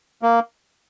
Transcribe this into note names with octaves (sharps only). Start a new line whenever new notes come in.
A#3